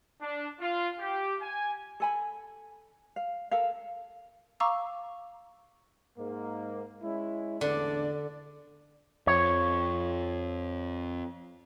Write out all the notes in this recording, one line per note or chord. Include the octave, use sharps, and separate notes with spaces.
D4
F4
G4
G#5
A4 G#5 B5
F5
A4 A#4 F5
F5 A#5 C#6 D6 E6
G#2 A#3
G#3 C#4 E4
A1 E2 D3 D4 D5
F2 C#5